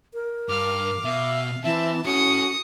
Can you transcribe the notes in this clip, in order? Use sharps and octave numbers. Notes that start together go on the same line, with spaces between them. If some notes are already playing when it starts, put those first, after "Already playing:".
A#4
G2 F5 D6 F6
B2 E5 F5
E3 C4 E5 A5
C#4 E4 F#4 A4 D#6 C#7